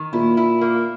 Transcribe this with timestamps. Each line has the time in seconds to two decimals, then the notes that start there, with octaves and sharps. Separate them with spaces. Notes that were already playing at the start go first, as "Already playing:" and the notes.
Already playing: D#3
0.13 A#2 E4
0.37 E4
0.61 A#3